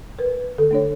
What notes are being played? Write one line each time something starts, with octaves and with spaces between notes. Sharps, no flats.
A#4 B4
D3 A4
A3 D4 C#5